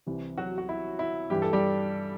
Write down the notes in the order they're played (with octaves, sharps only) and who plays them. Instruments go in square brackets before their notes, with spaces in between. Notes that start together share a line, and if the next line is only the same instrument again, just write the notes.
[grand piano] C2 C3 E3
F#3 F#4
F#4
E4
E4
G2 E3 G4
A4
G3 G4